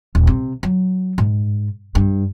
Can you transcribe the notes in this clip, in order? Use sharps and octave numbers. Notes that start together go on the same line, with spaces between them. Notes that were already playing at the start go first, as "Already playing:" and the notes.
D#1
C3
F#3
G#2
G2